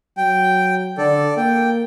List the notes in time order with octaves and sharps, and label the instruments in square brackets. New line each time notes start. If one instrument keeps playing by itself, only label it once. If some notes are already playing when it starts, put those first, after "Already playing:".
[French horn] F#3 [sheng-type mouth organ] G5
[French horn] D3 [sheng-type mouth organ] A4 D5
[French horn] A#3 [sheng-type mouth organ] G5